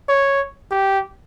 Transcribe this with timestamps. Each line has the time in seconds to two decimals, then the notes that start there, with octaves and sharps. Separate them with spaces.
0.09 C#5
0.71 G4